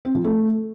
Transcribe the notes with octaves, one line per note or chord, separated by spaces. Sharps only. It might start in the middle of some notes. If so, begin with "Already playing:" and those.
C4
F3
A3